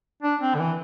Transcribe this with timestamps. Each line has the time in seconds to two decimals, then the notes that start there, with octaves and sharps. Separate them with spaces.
0.23 D4
0.41 C4
0.55 D3
0.59 E3